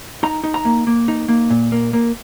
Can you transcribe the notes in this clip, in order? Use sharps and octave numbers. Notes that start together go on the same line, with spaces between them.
D#4 A#5
D#4
A#5
A#3
A#3
D#4
A#3
A#2
A#3
A#3